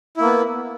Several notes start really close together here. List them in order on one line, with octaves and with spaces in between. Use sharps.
E4 A#3 B3